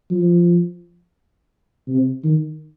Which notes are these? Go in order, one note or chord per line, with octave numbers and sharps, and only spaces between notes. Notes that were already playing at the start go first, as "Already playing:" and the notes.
F3
C3
D#3